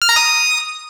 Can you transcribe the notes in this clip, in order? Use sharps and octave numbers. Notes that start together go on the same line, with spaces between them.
F6
A#5
D#6